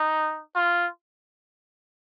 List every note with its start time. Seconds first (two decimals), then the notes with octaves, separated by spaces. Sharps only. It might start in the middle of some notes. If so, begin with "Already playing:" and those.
Already playing: D#4
0.55 F4